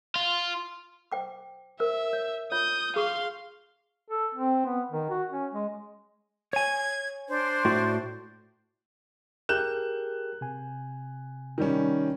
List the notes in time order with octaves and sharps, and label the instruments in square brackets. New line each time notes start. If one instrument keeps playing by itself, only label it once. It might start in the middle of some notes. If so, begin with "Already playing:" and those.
[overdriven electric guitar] F4
[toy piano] C5 G5 D6
[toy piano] A#4 C5 [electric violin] E5
[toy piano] C#5
[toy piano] F4 C#5 [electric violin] D#6 G6
[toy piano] G#4 C#6 [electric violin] F5 C6
[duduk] A4
C4
B3
D#3
F#4
C#4
G#3
[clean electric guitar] C#5 G#5 [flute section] G#6
[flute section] D4 C5
[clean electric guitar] A2 F#4
[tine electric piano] G4 G#4 A#4 [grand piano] F#6 G6 E7
[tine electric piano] C3 G#5
[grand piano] D#3 G3 C#4